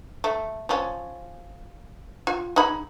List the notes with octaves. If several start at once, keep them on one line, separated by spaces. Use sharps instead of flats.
A3
F3 C#4
F4
D#4 G#4 B5